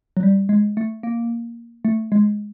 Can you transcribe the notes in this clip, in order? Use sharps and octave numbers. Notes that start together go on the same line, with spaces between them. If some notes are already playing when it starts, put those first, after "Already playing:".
F#3
G3
G#3
A3
A#3
A3
G#3